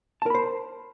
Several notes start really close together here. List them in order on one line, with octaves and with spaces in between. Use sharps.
A5 A#4 B5 C5